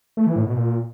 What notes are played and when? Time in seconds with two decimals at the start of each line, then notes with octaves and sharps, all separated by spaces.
0.17 A3
0.27 E3
0.36 A2
0.45 B2
0.55 A#2